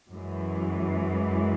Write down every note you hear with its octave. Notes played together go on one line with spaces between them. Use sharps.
F#2 E3 G#3